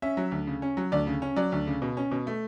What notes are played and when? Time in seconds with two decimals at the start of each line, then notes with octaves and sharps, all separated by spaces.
0.02 C#4 E5
0.17 F#3
0.32 D2
0.47 C#3
0.62 C#4
0.77 F#3
0.92 D2 D5
1.07 C#3
1.22 C#4
1.36 F#3 D5
1.52 D2
1.67 C#3
1.82 B2
1.97 C#4
2.11 B2
2.27 A3